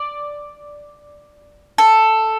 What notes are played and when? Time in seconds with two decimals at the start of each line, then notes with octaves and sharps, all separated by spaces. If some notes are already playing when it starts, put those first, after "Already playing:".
Already playing: D5
1.78 A4